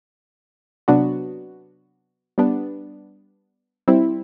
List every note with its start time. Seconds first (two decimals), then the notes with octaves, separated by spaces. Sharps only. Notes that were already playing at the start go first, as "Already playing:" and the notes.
0.88 C3 F#3 B3 D4 F#4
2.38 G3 B3 D4
3.88 G3 C4 E4